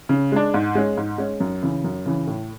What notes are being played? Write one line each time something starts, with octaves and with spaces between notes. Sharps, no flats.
C#3
G#3 D4
G#2
G#3 C#4
G#2
G#3 C#4
F#2
C#3 E3
F#2
C#3 E3
A2